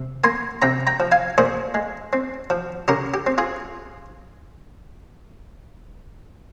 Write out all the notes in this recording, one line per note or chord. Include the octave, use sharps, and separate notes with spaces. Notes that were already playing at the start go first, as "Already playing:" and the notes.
Already playing: C3
A#3 G#5 C6
C3 G5 A#5
G5 A#5
F3
F5 G#5
A#2 G#4 C5
G#3
C4
F3
C#3 G4 A#4
G4
C4
F4 G#4